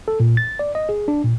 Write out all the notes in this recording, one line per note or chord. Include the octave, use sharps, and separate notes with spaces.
A4
A#2
A6
D5
D#5
G#4
D4
A#2